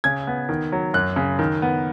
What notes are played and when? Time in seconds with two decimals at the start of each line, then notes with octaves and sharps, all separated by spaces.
0.04 C#3 G#6
0.27 B3
0.49 D#3
0.72 F#3
0.94 F#2 F#6
1.16 C#3
1.39 D#3
1.62 B3